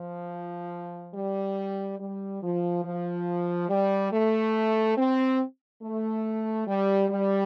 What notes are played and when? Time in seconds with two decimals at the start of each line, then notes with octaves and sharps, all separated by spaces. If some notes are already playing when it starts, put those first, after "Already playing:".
Already playing: F3
1.14 G3
2.00 G3
2.42 F3
2.85 F3
3.69 G3
4.12 A3
4.97 C4
5.83 A3
6.67 G3
7.10 G3